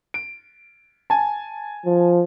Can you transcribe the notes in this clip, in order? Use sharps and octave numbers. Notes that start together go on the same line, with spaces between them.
D7
G#5 A5
F3